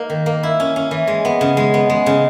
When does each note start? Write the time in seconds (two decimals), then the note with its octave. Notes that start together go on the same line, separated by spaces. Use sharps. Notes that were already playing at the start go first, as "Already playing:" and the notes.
Already playing: A#3 D#4
0.10 D#3
0.26 A#3
0.43 E4
0.60 C#4
0.76 C#4
0.91 E3
1.07 G#3
1.25 B3
1.41 C#3
1.57 G#3
1.74 B3
1.90 G#3
2.06 C#3